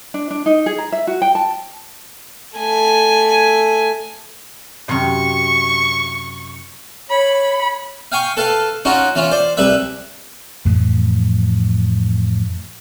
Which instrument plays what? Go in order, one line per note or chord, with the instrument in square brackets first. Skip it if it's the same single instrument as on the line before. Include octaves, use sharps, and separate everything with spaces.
[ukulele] D4
D4
D#4
G#4
A#5
E5
F#4
G5
A5
[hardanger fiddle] A3 G#5
[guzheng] F#2 C3 [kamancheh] C#6
[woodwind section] C#5 [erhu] B5
[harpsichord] F5 G5 G#5 C#6
A4 B4 F5
C#4 D#4 F4 F#4
E3 C#4 F4
C5 D5
C2 G3 B4 E5 B5
[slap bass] F2 A2 E3 F3